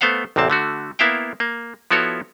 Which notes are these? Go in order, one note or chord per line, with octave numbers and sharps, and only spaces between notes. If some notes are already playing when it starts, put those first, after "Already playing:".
A3 B3 C5 F5 F#5
A1 E2 C3 C4 A5
D3 A3 F#4
A#3 B3 E4 E5 F5 G5
A#3
F3 B3 E4 F#4 A4 C#5